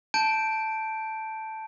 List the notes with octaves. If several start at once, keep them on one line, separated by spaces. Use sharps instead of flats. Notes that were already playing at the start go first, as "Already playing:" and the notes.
A5 G6 D7